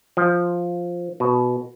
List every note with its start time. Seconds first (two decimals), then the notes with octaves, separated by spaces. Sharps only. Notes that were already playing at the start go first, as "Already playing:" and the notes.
0.17 F3
1.20 B2